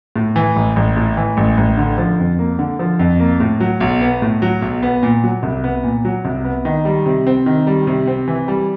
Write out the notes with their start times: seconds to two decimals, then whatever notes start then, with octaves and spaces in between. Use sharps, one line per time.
0.16 A2
0.36 E3
0.56 A1
0.76 A1
0.97 A2
1.17 E3
1.37 A1
1.57 A1
1.77 D3
1.98 F3
2.19 F2
2.39 A#3
2.59 D3
2.79 F3
2.99 F2
3.20 A#3
3.40 A2
3.60 F#3
3.80 B1
4.01 B3
4.22 A2
4.42 F#3
4.62 B1
4.83 B3
5.03 A#2
5.24 F#3
5.43 C2
5.64 B3
5.84 A#2
6.05 F#3
6.25 C2
6.44 B3
6.65 D#3
6.85 G3
7.06 C3
7.27 C4
7.46 D#3
7.67 G3
7.87 C3
8.07 C4
8.28 E3
8.48 G3